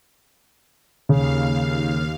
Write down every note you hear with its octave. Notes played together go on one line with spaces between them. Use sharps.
D#2 C#3 F5